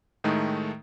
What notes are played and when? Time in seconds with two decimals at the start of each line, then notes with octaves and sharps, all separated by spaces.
0.24 A2 D#3 G#3 A3 D#4